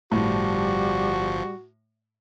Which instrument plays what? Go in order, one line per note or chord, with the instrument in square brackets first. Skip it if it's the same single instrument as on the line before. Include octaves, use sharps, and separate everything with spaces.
[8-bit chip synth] G1 F3 [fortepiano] A2 [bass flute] G3 [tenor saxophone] F#4